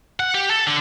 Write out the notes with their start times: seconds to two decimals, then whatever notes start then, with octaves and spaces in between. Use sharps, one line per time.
0.20 F#5
0.35 G4
0.50 A4
0.67 D3